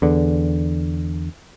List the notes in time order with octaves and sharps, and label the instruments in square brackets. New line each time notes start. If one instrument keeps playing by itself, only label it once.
[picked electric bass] E2 D3